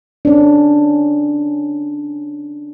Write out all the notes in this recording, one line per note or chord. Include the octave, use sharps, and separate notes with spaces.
C#4 D4